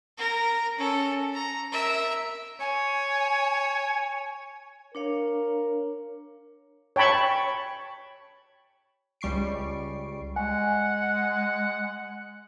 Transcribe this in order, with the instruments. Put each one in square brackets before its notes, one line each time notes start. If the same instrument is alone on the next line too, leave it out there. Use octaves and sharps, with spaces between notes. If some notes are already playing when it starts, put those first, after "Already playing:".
[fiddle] A#4
C#4 A4
A#5
A#4 E5
[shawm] C#5 [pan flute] G#5
[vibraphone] D4 C#5 F5 [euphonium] A#4
[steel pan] C#5 G5 A5 B5 C#6
[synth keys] C#2 G3 C#6 C7 D7
[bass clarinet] G#3 [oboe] F#5 [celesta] G#5